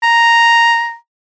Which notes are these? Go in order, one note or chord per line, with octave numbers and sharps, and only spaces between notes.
A#5